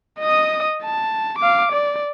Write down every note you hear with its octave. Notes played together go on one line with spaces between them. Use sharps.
D#5 D#6
A5
F5 D6
D5